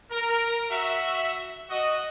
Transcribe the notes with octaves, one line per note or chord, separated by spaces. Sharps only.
A#4
F#4 E5
F#4 D#5